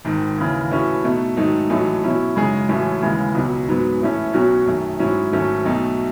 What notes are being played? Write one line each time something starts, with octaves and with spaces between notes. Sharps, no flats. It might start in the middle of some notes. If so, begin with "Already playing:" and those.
G#1 G#2 D#3
D#2 C#3 E3
A2 E3 A3 C#4 F#4
B2 A3 D#4
G#2 D#3 F#3 A3 D#4
A1 A2 F#3 A3 D#4
B2 F#3 C#4 E4
F#2 C#3 G#3 D#4 G#4
A1 A2 F#3 A3 C#4
D#2 C#3 E3 G#3
C#2 B2 F#3
G#2 F#3 B3
A2 E3 A3 C#4
B1 B2 F#3 C#4 F#4
F#2 D#3 A3
G#2 F#3 C#4 E4
G#1 G#2 F#3 A3 C#4
B1 B2 A3 D#4 F#4